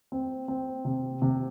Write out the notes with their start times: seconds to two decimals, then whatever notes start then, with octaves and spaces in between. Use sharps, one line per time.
0.12 C4
0.48 C4
0.85 C3
1.22 C3